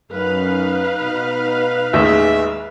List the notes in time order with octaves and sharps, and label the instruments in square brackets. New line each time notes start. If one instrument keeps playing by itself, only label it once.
[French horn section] F#2 [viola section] D#4 B4 F5
[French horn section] B2
[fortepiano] A1 D#2 D#3 [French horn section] G#3 [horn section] E5